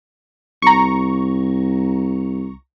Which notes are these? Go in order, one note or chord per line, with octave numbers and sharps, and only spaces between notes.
C2 A#5 C#6